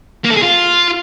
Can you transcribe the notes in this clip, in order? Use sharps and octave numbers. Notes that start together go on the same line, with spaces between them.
A#3
A4
G#4
F4